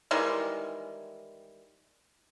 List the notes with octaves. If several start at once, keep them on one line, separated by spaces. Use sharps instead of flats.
D#3 E3 G3 G#3